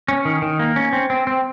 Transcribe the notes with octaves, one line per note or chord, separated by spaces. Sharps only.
C#4
D#3
D#3
A#3
C#4
C4
C4
C4